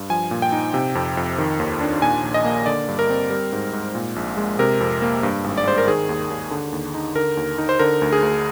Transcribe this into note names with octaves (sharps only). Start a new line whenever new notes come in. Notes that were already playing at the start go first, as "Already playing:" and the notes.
Already playing: G2
F3 G#5
A#2
G5
D#4
C3
F2
F2
D#3
D#2
D4
A#2 G#5
A#1
D#5
A#3
D3 D5
G2
A#4
C4
G3 A#4
G#2
G#2
A#2
A#1
G#3
C3 A#4
F2
A#3
G2
G#1
D5
G#3 C5
A#4
D#3 G#4
D#2
D#2
D3
D#2
D#4
D3 A#4
D#2
D#4
C5
D3 A#4
D2
G#4
D2